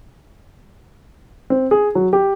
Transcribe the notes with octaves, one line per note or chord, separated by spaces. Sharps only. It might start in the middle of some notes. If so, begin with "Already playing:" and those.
C4
G#4
F#3
G4